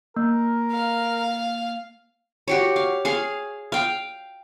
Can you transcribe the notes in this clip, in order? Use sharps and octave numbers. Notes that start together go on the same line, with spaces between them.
A#3 A#4
F5
F#4 G4 C#5
F5
G#4 F5
F5 G5